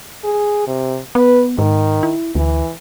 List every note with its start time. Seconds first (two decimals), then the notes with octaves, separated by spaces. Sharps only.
0.24 G#4
0.67 C3
1.15 B3 B4
1.58 G#2 D#3
2.03 E4
2.35 D2 E3